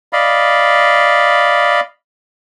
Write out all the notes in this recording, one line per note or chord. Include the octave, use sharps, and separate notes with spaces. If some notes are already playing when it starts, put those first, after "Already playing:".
D5 D#5 F5 B5